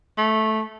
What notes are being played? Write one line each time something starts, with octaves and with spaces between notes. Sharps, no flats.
A3